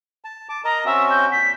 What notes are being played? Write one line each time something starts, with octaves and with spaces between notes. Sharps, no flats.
A5
A5 D6
A#4 D#5 A5 A#5
C4 C#4 F#4 E5
G6
A#2 B6